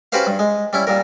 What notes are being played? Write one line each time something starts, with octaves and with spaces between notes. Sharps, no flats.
C#4 F#4 G4 B4 C5 F5
G2
G#3
G3 C#4 E4
A#2 G3 A#4